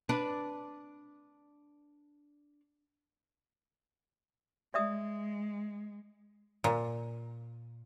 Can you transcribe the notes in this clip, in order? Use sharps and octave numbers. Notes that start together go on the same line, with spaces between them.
D4 B4
G#3 D5 E5 D#6
A#2